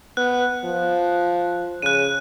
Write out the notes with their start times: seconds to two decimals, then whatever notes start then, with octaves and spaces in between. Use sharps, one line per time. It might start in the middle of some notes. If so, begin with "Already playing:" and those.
0.17 B3 F#6
0.65 F3
1.82 C#3 F#6 D#7